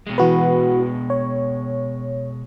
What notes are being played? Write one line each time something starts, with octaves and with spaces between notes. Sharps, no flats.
B2 G#3
E3 F#4 B4
C#5